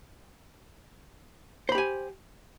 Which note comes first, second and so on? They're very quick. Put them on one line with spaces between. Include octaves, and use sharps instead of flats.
C5 B5 G4 G#5